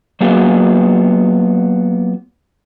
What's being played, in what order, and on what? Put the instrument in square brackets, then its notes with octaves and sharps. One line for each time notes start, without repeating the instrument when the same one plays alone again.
[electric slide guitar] F#3 A#3 B3 F4 F#4 G#4